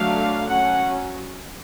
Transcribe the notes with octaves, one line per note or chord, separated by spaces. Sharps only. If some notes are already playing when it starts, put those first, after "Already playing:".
Already playing: D3 F#3 A3 D4 F5
F#3 C#4 F#5